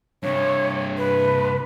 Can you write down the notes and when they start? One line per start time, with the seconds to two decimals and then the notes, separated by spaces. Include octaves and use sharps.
0.23 G2 C3 C#5
0.98 B4